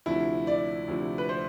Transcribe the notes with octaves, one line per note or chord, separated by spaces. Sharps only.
D2 C3 F3 E4
D5
D2 C3 F3
B4
C5